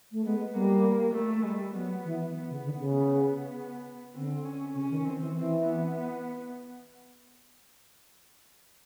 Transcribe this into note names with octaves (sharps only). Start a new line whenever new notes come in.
A3
G#3 B3
G3 A#3
A3
G3
F#3 B3
E3
B3
C#3
D3
C#3
B3
D3 C4
C#4
C#3 C#4
D#3
E3 C4
E3
E3 C4
B3